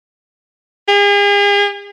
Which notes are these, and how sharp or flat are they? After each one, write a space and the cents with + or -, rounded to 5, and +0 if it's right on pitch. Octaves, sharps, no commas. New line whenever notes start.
G#4 -45